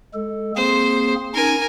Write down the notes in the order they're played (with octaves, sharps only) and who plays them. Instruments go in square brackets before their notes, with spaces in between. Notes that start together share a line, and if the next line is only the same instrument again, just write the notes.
[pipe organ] G#3 A4
[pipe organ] A#3 C4 G#4 [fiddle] C5
[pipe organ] C#4 D#4 [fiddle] A#4 G#5